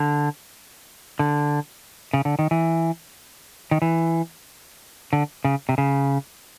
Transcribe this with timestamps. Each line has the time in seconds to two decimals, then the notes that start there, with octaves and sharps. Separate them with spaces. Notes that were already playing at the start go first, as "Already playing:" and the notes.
Already playing: D3
1.19 D3
2.13 C#3
2.25 D3
2.39 D#3
2.51 E3
3.71 D#3
3.82 E3
5.13 D3
5.44 C#3
5.69 C3
5.78 C#3